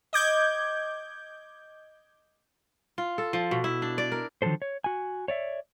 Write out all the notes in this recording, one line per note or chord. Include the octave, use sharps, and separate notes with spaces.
D#5 D6 G6 G#6
F4
A4
F3
B2
E4
D4
D5
A#4
D3 D#3 F3 F#3 A4 C5
C#5
F#4 G#5
C#5 D5 E5